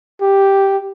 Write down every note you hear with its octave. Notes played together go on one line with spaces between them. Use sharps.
G4